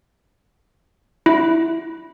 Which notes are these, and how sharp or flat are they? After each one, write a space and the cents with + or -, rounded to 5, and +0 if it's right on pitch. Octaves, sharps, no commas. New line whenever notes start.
E4 -5